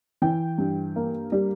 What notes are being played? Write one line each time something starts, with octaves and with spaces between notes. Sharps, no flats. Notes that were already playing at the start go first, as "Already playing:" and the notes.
E3 G5
G2
A#3
G3